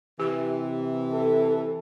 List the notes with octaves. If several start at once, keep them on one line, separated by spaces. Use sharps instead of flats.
C3 E3 G4
A4